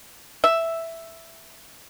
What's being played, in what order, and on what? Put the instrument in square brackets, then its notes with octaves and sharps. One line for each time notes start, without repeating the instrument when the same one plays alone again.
[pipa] E5